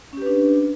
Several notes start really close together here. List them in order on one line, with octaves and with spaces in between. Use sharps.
C#4 G4 B4 D4